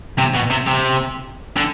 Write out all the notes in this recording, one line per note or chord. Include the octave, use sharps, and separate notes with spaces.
C3
B2
C3
C3
D3